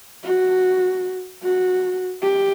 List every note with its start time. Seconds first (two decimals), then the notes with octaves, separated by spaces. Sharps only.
0.23 F#4
1.43 F#4
2.22 G4